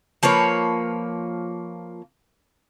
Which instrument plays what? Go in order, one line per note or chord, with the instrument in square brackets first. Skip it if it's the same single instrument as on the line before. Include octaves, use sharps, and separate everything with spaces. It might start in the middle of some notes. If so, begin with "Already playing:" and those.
[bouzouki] F3 A#3 B4 C#5